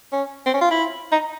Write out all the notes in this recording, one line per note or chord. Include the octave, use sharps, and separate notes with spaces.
C#4
C4
C#4
F4
E4
D#4